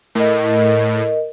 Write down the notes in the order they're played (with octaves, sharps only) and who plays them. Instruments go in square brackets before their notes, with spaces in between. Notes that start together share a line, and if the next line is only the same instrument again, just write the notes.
[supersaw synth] A2 [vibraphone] A#4 D#5